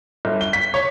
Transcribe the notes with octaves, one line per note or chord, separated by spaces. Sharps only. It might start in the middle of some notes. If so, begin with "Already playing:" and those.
G1
G7
B6
C#5